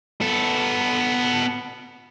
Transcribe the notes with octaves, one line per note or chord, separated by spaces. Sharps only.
B3 A4